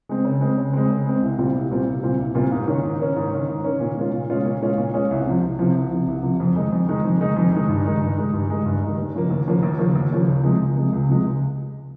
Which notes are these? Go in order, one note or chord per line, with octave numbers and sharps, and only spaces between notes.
G#3 C4
C#3
G#3 C4
C#3
G#3 C4
C#3
G#3 C4
C2
A#2 G3 C4 F4
C2
A#2 G3 C4 F4
C2
A#2 G3 C4 F4
C2
A#2 G3 C4 F4
G#2
D#3 A#3 C#4
G#2
D#3 A#3 C#4
G#2
D#3 A#3 C#4
G#2
D#3 A#3 C#4
A#2
G#3 C#4 F4
A#2
G#3 C#4 F4
A#2
G#3 C#4 F4
A#2
G#3 C#4 F4
C2
C3 F3
C2
C3 F3
C2
C3 F3
C2
C3 F3
F2
D#3 G#3 D#4
F2
D#3 G#3 D#4
F2
D#3 G#3 D#4
F2
D#3 G#3 D#4
G2
D#3 G#3 D#4
G2
D#3 G#3 D#4
G2
D#3 G#3 D#4
G2
D#3 G#3 D#4
D#2
C#3 F3 A#3
D#2
C#3 F3 A#3
D#2
C#3 F3 A#3
D#2
C#3 F3 A#3
C#2
C3 F3 G#3
C#2
C3 F3 G#3
C#2
C3 F3 G#3
C#2